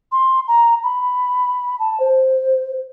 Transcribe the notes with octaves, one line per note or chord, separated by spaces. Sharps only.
C6
A#5
B5
A5
C5